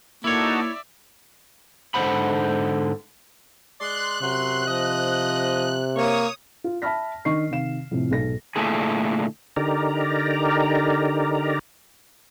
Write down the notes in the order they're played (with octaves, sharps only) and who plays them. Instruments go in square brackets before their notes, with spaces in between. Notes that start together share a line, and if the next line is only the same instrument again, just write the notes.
[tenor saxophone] A#3 [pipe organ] D#4 F#4 A4 [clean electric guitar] E4 C#5 [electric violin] D5 E5
[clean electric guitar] G#2 D3 G#3 C5 F#5 B5
[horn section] G#3 D5 C6 [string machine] F#6
[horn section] F#2 F#3 C6 [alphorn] C3
[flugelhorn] F3 [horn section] D#5
[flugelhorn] A#3 [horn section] C#5 [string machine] D#6
[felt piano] F4
E5 A5 B5 F6 A#6 B6
D#3 D4 D#5 C#6 C7
C3 D#3 F5 E7
F2 A2 C3
B1 G#2 A4 A#6
[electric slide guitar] A#2 D3 A3 E4 G#4
[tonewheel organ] D3 D#4 G4 A#4 D5 A#5